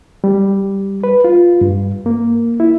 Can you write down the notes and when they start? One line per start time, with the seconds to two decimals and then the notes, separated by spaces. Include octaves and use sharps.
0.24 G3
1.04 B4
1.24 F4
1.61 G2
2.06 A#3
2.60 E4